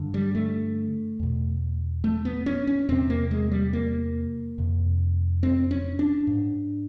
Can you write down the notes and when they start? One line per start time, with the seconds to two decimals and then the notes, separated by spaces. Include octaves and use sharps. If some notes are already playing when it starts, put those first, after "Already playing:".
Already playing: G2 D3
0.14 G3
0.35 A3
1.19 E2 B2
2.04 A3
2.25 B3
2.46 C#4
2.67 C#4
2.88 E2 C3 C4
3.10 A#3
3.31 G#3
3.52 G3
3.73 A#3
4.58 F2 C3
5.43 C4
5.71 C#4
5.99 D4
6.27 G#2